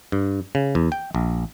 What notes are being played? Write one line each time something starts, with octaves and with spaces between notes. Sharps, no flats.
G2
C#3
E2
G5
A#1